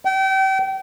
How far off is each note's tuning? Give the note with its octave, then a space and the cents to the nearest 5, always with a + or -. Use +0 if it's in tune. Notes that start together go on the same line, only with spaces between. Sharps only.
G5 -35